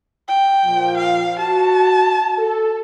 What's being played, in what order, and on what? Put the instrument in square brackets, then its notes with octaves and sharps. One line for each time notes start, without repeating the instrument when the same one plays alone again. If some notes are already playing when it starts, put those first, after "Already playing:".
[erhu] G5
[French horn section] A#2 F3
[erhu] F5
[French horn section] F#4 [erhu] A5
[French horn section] A4